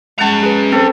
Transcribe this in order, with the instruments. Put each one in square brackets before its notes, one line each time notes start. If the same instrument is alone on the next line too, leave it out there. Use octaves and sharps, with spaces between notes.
[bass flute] G#3 [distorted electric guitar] C#4 A#5 [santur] F#5 A5 C#6
[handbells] G#4 B4
[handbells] C4 C5 [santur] A4